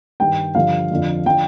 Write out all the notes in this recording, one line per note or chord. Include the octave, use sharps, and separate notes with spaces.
G2 D#3 G5
G2 D3 F3 F5
F2 D3 F3
D3 F3 G5